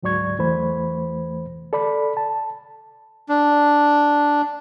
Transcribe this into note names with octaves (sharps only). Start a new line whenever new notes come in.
D2 G#2 F#3 D5 C#6 G#6
E2 E3 A3 C5 B5
A4 D5 B5
A5
D4